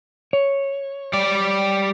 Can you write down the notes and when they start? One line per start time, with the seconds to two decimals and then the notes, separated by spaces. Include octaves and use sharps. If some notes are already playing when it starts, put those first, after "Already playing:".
0.33 C#5
1.13 G3 D5